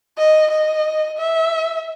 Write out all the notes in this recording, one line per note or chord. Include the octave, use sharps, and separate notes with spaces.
D#5
D#5
E5